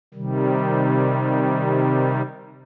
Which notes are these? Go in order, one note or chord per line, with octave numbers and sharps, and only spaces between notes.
C3 D#3 G3